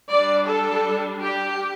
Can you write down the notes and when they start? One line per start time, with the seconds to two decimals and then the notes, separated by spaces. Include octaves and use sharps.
0.10 G3 D4 D5
0.48 A4
1.22 G4